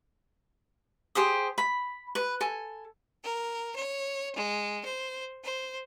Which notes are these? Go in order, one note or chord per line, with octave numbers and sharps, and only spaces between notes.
G4 G#4 C5 D#6
B5
B4
A4 G#5
A#4
C#5
G#3
C5
C5